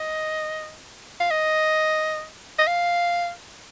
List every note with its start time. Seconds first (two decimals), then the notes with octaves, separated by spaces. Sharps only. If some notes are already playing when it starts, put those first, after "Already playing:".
Already playing: D#5
1.20 F5
1.31 D#5
2.59 D#5
2.67 F5